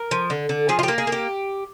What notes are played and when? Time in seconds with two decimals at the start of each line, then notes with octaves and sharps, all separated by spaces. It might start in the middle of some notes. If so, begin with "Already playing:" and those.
Already playing: A#4
0.11 F3
0.30 D3
0.49 D3
0.69 F3 G#4
0.79 F4
0.83 A#3 G4
0.98 G#4
1.07 A#3
1.12 G4